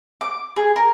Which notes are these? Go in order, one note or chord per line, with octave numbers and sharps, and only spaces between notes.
D6
G#4
A#4